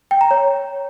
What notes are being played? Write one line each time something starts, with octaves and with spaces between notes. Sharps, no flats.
G5
A#5
C#5